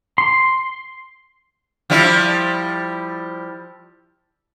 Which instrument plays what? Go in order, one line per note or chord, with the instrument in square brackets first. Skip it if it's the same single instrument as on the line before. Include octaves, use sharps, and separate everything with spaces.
[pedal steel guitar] C6
[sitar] F3 G3 E4